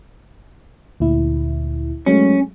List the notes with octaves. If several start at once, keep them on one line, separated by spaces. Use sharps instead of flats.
D2 A#2 E4
F#3 G#3 A3 C#4